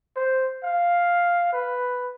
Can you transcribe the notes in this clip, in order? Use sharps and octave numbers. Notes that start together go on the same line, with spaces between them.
C5
F5
B4